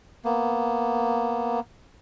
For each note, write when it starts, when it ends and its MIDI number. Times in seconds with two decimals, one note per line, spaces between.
0.25 1.60 58
0.25 1.60 59